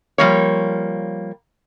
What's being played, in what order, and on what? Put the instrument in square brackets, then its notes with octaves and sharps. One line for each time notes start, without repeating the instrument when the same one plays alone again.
[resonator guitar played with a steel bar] F3 G3 A#3 C#5